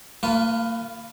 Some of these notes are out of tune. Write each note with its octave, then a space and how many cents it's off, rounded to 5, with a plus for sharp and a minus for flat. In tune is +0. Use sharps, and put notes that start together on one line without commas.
A#3 -40 F4 +0 B4 +15